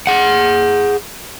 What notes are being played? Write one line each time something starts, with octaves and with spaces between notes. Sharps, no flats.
G#4 F#5